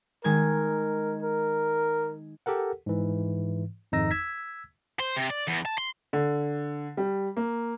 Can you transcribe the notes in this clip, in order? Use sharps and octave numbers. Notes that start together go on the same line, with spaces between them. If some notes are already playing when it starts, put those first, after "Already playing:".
D#3 G#3 A#4 G#6
A#4
G4 A4 A#4 F#5
G#2 E3
G#1 F2 D#4 E6 A#6
E6 G#6 B6
C5
C3
D5
E2
A5
C6
D3
G3
A#3